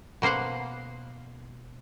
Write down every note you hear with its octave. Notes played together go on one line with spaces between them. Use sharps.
B2 A#3 C5 F5 F#5